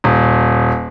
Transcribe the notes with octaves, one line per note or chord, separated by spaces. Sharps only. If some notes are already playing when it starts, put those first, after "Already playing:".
D#1